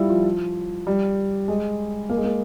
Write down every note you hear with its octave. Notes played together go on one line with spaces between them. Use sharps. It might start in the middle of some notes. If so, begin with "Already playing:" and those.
Already playing: G3 E4 F4
F3
G3
G#3
A#3
G#3
A#3